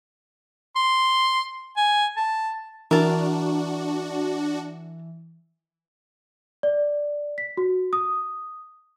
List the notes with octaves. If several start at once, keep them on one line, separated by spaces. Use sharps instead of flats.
C6
G#5
A5
E3 D4 F#4 A#4 A5
D5
B6
F#4
D#6